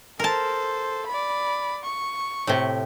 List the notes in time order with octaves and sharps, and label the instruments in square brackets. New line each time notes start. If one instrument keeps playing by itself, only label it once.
[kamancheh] A4 C5 [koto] A#4 A5
[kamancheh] D5 B5
C#6
[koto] A2 C3